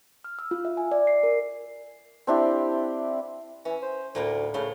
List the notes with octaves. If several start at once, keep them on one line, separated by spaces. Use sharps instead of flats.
F6
E6
F4
E5
G#5
D5
C7
A#4
C4 D4 E4 G4
E3 C#4
C5
D2 A2 A#3 F4
A2 C#3 C6